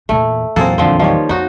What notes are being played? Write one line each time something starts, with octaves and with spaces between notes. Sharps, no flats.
E2 A#2 A3
A#1 E2 E3 F#3 A#3 C4 G#4 A4
F2 D3 F3 C4
D#3 F3 G3 C#5
F2 D#4 F#4